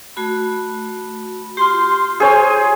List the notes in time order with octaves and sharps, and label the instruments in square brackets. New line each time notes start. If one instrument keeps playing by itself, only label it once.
[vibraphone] A3 F#4 B5
[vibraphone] F4 G4 [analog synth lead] C6
[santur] G#4 C5 C#5 [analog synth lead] G#5